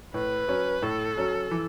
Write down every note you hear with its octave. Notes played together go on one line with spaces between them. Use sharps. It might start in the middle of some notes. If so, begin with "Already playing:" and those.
A2 B4
F#3 C#4
A2 A4
F#3 C#4
E3